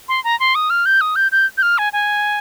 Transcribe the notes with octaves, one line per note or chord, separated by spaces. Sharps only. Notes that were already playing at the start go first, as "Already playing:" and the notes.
C6
A#5
C6
D#6
F6
G6
D#6
G6
G6
G6
F6
G#5
G#5